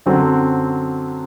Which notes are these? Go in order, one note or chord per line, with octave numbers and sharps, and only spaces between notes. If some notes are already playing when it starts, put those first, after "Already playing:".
F#2 D3 F#3 C4